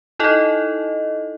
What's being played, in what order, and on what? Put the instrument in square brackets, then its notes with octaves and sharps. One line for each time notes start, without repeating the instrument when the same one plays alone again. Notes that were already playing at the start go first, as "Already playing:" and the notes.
[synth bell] D#4 E4 A4 D#5